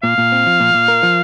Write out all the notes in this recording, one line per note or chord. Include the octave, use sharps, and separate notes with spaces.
A#2 F5
A#2
C4
F3
A#2
A#2
A#4
F3